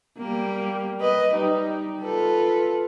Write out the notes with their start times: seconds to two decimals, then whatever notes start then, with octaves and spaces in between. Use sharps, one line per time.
0.18 G3 A#3
1.01 B4 D#5
1.35 G3 D#4
2.03 F4 A4 B4